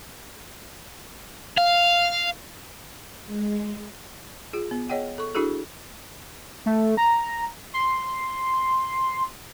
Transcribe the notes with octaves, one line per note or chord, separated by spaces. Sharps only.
F5
G#3
F4 G#4
B3
G#4 C#5 D#5 F#5 G5
A4 C#6
D4 E4 F#4 G#4 A4
A3
A#5
C6